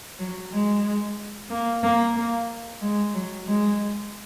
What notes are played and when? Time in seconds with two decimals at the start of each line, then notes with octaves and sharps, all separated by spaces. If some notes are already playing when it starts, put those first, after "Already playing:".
0.19 F#3
0.53 G#3
1.50 A#3
1.83 A#3
2.16 A#3
2.82 G#3
3.15 F#3
3.47 G#3